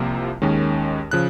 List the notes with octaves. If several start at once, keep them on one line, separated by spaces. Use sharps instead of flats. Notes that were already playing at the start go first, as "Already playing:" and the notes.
Already playing: C2 C3 F3 A#3
D#2 D#3 G#3 C#4
C#3 F3 F#6